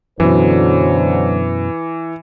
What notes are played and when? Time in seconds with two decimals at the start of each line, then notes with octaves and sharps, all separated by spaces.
0.20 F#2 B2 D3 E3 F#3 C5